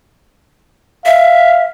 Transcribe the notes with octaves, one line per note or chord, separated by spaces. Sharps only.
E5 F5